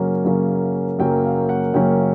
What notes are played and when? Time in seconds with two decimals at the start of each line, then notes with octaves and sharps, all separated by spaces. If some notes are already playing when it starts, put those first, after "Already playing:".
Already playing: F#2 C#3 F#3 A#3 C#4
0.25 F#2 C#3 F#3 A#3 C#4
0.99 F#2 C#3 F#3 A#3 C#4 G5
1.24 F5
1.49 F#5
1.74 F#2 C#3 F#3 A#3 C#4 G5